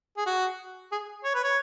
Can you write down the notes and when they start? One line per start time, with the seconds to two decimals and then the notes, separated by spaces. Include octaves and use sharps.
0.17 G#4
0.26 F#4
0.92 G#4
1.24 C#5
1.35 B4
1.44 C#5